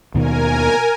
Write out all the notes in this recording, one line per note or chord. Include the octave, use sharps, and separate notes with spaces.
D#2 B2 D#3 A#4 G#5